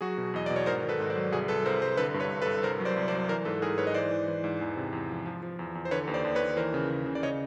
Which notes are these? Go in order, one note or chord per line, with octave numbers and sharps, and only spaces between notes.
F#3 F#4 G#4
B2
E2 D#5
B2 D5
C#5
G#2 A#4 C5
D#3
A4 B4
G#2
C5 D5
F#3
C2 F#4 G#4
C2 A4 B4
C2 A#4 C5
C2 A#4 C5
D3 A4 B4
G2
B4 C#5
G2
A4 B4
G2
C2 A#4 C5
F#3
C5 D5
C2
C5 D5
F#3
E3 A#4 C5
G#2 A4 B4
G#2 G#4 A#4
G#2 B4 C#5
D#5
E3 C5 D5
E3
E3
G#2
E2
C3
E2
F3
F3
F3
E2
E2
C5
D3 B4 C#5
D#2
C5 D5
D#2
B4 C#5
D#2
E3 A#4 C5
C#3
C#3
C#3
D5
C#3 C#5 D#5